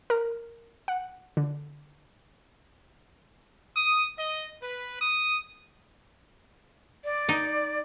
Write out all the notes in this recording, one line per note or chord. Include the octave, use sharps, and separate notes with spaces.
A#4
F#5
D3
D#6
D#5
B4
D#6
D5
D#4